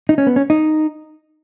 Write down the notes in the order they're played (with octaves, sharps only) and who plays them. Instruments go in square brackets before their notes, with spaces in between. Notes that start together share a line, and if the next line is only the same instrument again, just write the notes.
[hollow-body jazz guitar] D#4
C#4
B3
C#4
D#4